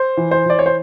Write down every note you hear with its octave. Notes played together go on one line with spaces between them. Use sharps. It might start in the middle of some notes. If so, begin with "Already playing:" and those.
Already playing: C5
E3
C5
E3 D5
C#5
C5